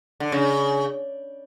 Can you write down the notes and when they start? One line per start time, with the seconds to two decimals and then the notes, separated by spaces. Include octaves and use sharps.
0.20 D3
0.32 C#3